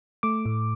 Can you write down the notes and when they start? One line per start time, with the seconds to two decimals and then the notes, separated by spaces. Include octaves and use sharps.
0.23 A3 D6
0.46 A2